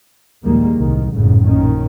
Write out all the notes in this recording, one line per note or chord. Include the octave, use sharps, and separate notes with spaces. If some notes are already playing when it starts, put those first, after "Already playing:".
A#1 D#2 D#3 G3 G#3 A#3
C2 A2 D#3
G#1 F#2 A2 C#3
A#1 D#3 C#4